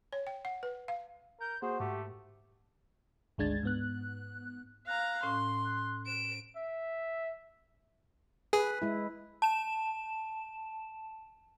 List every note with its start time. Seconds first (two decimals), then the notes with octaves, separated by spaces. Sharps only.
0.13 C#5
0.27 G5
0.45 F#5
0.63 B4
0.88 F5
1.40 A#4 G6
1.62 A#3 F#4 G#4 C5
1.80 G#2 A3 G4
3.38 G#1 D2 G#3 D4 G#6 A6
3.63 G#2 B3 F#6
4.87 F5 A#5 F#6
5.23 A2 C#4 C6
5.64 F#6
6.06 D7 E7
6.56 E5
8.53 G#4 B4
8.82 G#3 E4
9.42 A5 E7